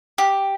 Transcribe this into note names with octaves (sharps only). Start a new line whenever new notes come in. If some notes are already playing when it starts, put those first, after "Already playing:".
G4